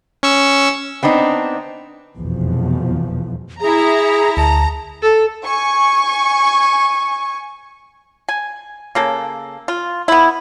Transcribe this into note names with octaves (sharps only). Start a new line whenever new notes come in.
C#4 C#6 E6
B3 C4 D4 D#4
F1 B1 E2 B2 F3
E4 G#4 A#5
D2 A5 A#5
A4
G#5 C#6
G#5
C#3 A#3 A4
F4
B3 E4